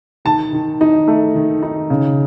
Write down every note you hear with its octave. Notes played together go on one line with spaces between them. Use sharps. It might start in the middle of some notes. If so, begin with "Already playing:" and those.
D#3 A5
D#3
D#4
A3
D#3
D#4
C#3